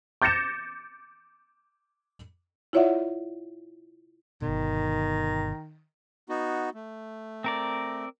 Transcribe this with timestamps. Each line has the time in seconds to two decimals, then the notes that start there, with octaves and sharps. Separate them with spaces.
0.22 D6 G6 A6 A#6 C#7 E7
2.73 E4 F4 C#5 D5 E5 F#5
4.42 G1 B2 D#3
6.29 B3 D#4 F#4
6.74 A3
7.44 C4 A#4 D5